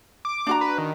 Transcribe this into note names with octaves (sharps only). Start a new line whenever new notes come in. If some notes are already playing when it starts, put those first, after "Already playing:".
D6
D4 F#4 A#5
B4
D#3